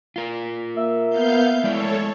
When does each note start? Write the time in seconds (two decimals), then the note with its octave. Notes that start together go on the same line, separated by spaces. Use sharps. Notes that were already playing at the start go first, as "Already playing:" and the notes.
0.16 F4 A#4
0.77 A#3 E5
1.09 B3 F5 G6
1.64 G#3 A3 E4 A4 C#5 D5